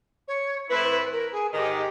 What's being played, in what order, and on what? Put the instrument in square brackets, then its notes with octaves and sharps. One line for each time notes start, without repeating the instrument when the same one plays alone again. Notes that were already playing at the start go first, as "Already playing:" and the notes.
[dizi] C#5
[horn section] A2 E3 A3 C4 E4 [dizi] B4
[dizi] B4
A#4
G#4
[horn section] G#2 D#3 G#3 [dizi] G4 G#4